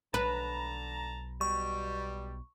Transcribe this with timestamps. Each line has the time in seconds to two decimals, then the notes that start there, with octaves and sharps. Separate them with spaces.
0.14 B1 D3 B4 A5 A#5
1.41 B2 G3 C#6